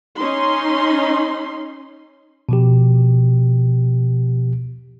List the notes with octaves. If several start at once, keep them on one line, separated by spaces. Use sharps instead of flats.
C#4 D#4 C6
B2 F3 G4